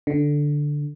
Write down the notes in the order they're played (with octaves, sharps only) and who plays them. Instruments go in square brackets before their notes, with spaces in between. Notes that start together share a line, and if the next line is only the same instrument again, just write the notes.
[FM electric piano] D3